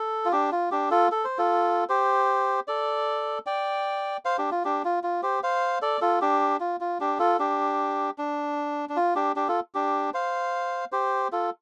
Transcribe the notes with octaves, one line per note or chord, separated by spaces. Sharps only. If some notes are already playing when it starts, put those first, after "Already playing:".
Already playing: A4
F4
D4 G4
F4
D4 G4
F4 A4
A4
C5
F4 A4
G4 C5
A4 D5
D5 G5
C5 F5
D4 G4
F4
D4 G4
F4
F4
G4 C5
C5 F5
A4 D5
F4 A4
D4 G4
F4
F4
D4 G4
F4 A4
D4 G4
D4
D4
F4
D4 G4
D4 G4
F4 A4
D4 G4
C5 F5
G4 C5
F4 A4